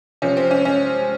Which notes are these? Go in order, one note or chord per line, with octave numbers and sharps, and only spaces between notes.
C3 F3 C#4
C4
C#4
C#4